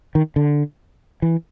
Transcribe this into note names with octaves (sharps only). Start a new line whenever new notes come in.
D#3
D3
E3